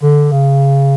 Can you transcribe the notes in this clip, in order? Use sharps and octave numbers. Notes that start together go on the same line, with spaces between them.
D3
C#3